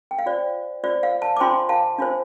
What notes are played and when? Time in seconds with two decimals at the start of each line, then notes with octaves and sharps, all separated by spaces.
0.11 G5
0.19 F5
0.26 F4 C5 D5
0.84 F4 C5 D5
1.03 F5
1.22 F5 A5
1.37 D6
1.40 D4 F4 C5 G5 C6
1.69 F5 A5
1.99 D4 F4 C5